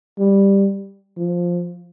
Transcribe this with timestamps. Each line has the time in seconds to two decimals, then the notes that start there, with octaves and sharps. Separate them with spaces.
0.18 G3
1.17 F3